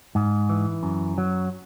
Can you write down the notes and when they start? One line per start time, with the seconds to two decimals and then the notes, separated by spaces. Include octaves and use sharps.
0.15 G#2
0.49 E3
0.83 F#2
1.18 F#3